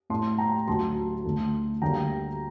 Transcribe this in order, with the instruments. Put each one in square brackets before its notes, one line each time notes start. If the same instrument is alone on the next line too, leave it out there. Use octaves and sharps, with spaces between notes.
[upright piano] A2 A3 A5 C6
G5 A#5
D2 D3 F#3 A5 C6
D2 D3 A3
D2 D3 G3 A#3 G5 A#5